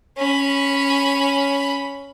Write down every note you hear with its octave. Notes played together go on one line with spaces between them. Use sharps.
C#4 B5